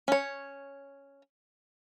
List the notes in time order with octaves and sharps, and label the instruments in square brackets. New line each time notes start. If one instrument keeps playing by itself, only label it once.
[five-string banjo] C#4 C#5